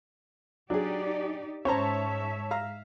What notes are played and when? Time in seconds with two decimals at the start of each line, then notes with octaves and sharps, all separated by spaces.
0.70 F#3 D4 D#4 G4 G#4 D5
1.65 G#2 C#4 C5 C#5 E5 A5 A#5
2.51 F5 A#5 F6